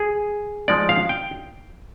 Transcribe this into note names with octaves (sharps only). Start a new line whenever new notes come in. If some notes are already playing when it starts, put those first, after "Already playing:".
Already playing: G#4
F3 G#3 D#4 D5
F5
G5